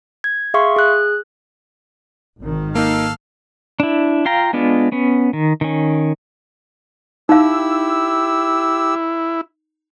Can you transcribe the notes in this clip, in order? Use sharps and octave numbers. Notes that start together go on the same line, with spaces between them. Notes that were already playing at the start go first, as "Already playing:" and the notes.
G#6
G#4 E5 F5 C6 C#6
G#4 F#6
G#1 D#3
A#3 D#4 A4 F5
D4 E4
F4 F5 G5 A#5
G#3 B3 D4 F4
B3 C#4
D#3
D#3 C#4
D#4 E4 G4 F5 E6